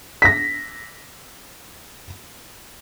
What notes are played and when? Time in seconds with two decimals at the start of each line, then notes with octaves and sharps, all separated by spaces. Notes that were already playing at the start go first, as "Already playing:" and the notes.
0.22 A#6 B6